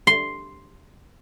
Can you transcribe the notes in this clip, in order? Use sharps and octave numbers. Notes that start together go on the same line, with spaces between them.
C6